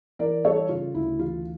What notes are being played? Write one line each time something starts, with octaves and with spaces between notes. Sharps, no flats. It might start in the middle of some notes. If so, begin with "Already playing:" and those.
E3 A#4 D5
G3 A4 C#5
C#3 F4
D2 E4
E3 F4